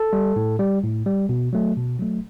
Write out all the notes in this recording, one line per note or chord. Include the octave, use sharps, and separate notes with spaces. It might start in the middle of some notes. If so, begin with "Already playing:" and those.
Already playing: A4
G3
A2
G3
A2
G3
B2
F#3 A3
B2
F#3 A3